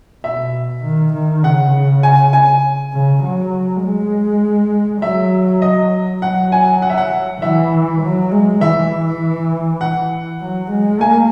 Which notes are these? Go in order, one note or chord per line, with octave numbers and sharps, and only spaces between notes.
B2 E5
D#3
D#3
C#3 F#5
G#5
G#5
C#3
F#3
G#3
F#3 E5
D#5
F#3 F#5
G#5
F#5
E5
F#5
E3 E5
F#3
G#3
E3 E5
F#5
F#3
G#3
A#3 G#5